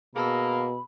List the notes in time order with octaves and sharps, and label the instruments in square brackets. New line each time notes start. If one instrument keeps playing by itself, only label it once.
[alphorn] B2 [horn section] A#3 [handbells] G#4 A5 E6 [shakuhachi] B5